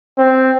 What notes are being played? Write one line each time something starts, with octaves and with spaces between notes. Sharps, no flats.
C4